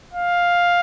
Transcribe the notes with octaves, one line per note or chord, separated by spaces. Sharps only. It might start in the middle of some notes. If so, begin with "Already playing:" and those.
F5